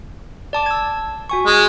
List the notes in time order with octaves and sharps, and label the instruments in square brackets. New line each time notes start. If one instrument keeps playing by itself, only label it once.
[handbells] D5 A5 D6
E6 G#6
F#4 G#5 C#6
[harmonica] G#3